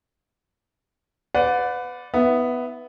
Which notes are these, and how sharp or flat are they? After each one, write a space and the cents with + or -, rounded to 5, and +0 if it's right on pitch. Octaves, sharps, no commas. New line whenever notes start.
B4 +25 D5 -10 F#5 -35
B3 +5 E4 -45 E5 +10